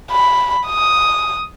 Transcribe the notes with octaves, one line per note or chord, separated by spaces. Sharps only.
B5
D#6